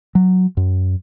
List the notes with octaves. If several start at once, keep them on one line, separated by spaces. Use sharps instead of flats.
F#3
F#2